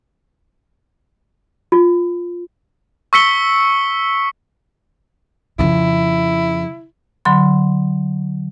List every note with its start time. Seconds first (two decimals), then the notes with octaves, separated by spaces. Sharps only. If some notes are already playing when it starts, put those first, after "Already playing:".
1.72 F4
3.13 C#6 E6 B6 C#7 G7
5.59 F2 C#3 E4
7.25 D3 F#3 B5 C6